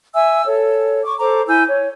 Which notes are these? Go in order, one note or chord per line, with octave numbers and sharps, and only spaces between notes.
E5 G#5 E6
A4 C#5
C#6 D6
A4 C5 A#5 D6
E4 G#5 E6 G6
C#5